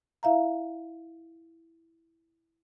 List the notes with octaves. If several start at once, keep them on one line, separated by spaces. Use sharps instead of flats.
E4 E5 F5 A#5